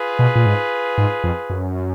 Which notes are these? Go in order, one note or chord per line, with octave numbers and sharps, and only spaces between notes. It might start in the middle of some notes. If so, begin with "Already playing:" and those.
Already playing: F4 G#4 B4
B2
A#2
G#2
G#2
F2
F#2